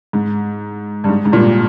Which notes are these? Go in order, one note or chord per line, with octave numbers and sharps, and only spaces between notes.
G#2
G2
G#2
G#2
G2 A#2